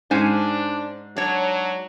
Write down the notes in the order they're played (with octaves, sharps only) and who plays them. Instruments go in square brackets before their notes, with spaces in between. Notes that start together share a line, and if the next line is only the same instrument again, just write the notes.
[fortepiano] G#2 [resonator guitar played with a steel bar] C#4 C5 G#5 [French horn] D4
[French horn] F#3 [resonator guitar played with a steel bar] D4 C#5